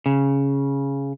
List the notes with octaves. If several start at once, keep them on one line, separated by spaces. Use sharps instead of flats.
C#3